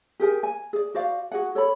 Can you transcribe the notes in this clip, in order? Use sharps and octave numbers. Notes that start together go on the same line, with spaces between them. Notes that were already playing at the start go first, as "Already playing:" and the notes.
G4 G#4 A#4 G#5
G#5
G#4 D5
F#4 C5 D5 F5
F#4 G#4 F#5
A4 C#5 D5 B5